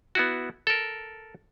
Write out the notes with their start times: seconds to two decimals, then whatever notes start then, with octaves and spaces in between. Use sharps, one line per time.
0.15 B3 E4 F#4
0.67 A4 A#4